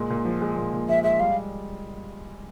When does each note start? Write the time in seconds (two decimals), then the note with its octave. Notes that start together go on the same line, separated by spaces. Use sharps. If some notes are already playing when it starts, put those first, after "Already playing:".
Already playing: A#2 G#3
0.10 A#2
0.25 F3
0.41 G#3
0.57 A#2
0.73 A#2
0.89 F3 E5
1.03 G#3 E5
1.20 G3 F5